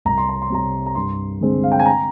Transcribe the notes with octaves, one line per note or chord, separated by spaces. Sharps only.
C2 A#5
C6
A#5
C6
C3 G3 C4 A#5
A#5
G2 C6
D3 G#3 C4
F5
G5
G#5
A#5